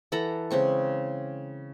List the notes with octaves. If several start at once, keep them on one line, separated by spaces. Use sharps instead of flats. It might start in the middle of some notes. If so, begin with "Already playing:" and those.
E3 A4 F#5 A#5
C#3 G#3 C4 C#6